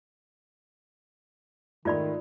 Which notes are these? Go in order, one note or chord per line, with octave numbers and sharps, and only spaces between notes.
G#2 D#3 A3 F4 D5 B5